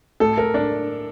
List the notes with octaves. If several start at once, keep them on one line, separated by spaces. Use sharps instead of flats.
A2 A4
A#4
D4